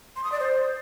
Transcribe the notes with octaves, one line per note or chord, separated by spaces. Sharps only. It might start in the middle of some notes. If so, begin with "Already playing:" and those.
C6
D#6
D5
C5